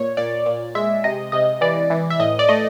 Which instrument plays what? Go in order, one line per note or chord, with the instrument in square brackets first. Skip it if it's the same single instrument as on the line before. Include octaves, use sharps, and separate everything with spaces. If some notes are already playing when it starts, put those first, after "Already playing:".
Already playing: [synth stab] A#2 C#5
A#2 D5
A#2
G#3 E5
C3 D#5
C3 D#5
E3 D5
E3
E5
A2 D#5
D5
A3 D#5